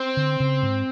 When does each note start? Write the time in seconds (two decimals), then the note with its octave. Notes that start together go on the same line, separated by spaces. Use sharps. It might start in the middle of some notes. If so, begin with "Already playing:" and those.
Already playing: C4
0.17 D3
0.40 C#3
0.62 G#2